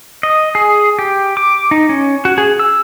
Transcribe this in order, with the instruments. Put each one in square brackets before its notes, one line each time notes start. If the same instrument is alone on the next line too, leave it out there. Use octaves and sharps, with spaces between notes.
[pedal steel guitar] D#5
G#4
G4
D6
D#4
C#4
F#4
G#4
E6